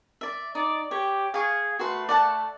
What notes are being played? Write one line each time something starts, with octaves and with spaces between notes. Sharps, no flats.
D5 E5
D#4 D5
G4 C#5
G#4 F5 C#6
A3 F#4 B4 C6
D5 F#5 A5